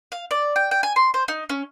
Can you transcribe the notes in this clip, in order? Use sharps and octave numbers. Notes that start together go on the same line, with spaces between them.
F5
D5
G5
G5
G#5
C6
C5
D#4
C#4